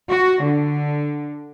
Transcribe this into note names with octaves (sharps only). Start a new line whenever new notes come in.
F#4
D3